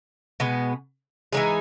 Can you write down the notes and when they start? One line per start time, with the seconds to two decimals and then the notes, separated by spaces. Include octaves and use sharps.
0.40 B2 G#3 B3
1.33 E3 G#3 D#4 G#4